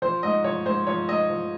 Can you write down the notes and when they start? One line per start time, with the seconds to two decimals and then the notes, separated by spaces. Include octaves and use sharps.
0.02 F3 C5
0.23 G#2 D#5
0.44 F3 C#5
0.66 G#2 C5
0.87 F3 C#5
1.08 G#2 D#5
1.30 F3